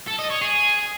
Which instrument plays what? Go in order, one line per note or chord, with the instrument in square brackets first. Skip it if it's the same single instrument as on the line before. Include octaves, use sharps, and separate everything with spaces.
[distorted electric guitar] A4
D#5
C#5
G#4